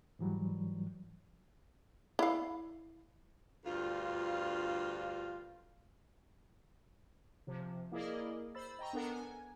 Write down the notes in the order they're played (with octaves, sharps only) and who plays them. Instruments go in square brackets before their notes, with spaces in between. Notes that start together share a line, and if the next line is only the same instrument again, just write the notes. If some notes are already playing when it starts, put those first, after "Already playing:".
[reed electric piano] G#2 E3 F#3 G3
[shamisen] E4 F5
[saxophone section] D2 G2 F4
[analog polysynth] C3 F3
A#3 E4 G#4 A#4 D5 D#5
C5 B5 E6 A6
D#5 G5 A#5 C#6
B3 D4 A4 A#4 F#5 A#5
G#5